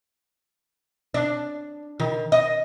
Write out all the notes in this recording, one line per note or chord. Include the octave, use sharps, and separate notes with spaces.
D4
D#3
D#5